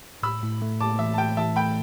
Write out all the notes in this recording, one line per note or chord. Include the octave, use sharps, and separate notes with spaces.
A2 B5 E6
A2
A3
A2 A5 D6
E3 E5
A5
A3 G5
E3 E5 A5
A3 G5 B5